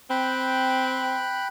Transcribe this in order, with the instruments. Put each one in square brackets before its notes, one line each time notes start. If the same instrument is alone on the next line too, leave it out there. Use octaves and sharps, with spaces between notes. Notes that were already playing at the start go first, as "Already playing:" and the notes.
[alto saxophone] C4 [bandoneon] G5 B5 F#6